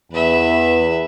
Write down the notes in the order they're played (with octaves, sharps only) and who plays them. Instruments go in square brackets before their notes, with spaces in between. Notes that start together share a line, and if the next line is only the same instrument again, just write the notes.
[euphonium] E2 [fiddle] B4 E5